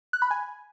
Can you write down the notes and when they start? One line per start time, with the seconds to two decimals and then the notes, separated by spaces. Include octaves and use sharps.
0.13 F#6
0.22 B5
0.31 G#5